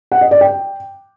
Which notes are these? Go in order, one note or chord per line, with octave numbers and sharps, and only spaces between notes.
F#5
D#5
D5
G5